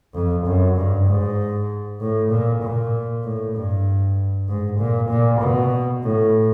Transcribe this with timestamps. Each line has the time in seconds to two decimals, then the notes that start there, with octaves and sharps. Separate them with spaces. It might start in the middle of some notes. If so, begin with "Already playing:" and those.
0.14 F2
0.46 F#2
0.76 G2
1.07 G#2
2.00 A2
2.30 A#2
2.62 A#2
3.23 A2
3.55 G2
4.48 G#2
4.79 A#2
5.09 A#2
5.40 B2
6.03 A2